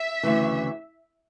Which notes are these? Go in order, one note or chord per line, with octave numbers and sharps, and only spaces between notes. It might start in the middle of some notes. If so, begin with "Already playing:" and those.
Already playing: E5
D2 C#3 E3